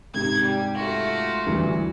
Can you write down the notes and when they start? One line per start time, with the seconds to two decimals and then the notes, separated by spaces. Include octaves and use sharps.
0.14 G#2 C3 D#4 G#6
0.44 G3
0.74 A3 F4 F#4
1.46 D2 G2 E3